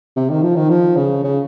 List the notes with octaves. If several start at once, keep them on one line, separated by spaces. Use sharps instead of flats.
C3
D#3
F3
D#3
F3
C#3
C#3